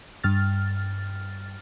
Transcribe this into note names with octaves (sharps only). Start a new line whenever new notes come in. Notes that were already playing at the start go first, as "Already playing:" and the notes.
G2 F6 A6